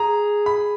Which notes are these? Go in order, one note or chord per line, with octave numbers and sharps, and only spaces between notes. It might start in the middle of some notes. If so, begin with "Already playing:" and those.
Already playing: G#4 A#5
B5